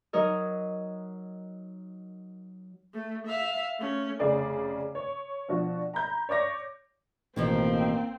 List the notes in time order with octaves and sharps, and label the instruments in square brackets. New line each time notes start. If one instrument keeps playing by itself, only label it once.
[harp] F#3 D#4 A#4 D#5
[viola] A3
E5 F5
A3 C#4
[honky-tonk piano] F1 C#3 G#4 D5 D6
C#5
B2 F3 D4 F#4
A#5 B5 G6
C#5 D5 D6 A#6
[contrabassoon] A1 [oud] B2 D#3 F3 [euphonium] A#3 [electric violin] C4